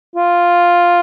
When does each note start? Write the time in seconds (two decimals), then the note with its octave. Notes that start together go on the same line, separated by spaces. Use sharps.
0.16 F4